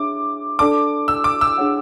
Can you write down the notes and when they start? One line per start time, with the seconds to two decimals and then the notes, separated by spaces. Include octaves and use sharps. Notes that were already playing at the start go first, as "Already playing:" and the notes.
Already playing: D4 G#4 C#5 E5 D6
0.59 D4 A4 D5 A5 D6
1.08 E6
1.24 D6
1.41 E6
1.58 D4 G#4 C#5 F#5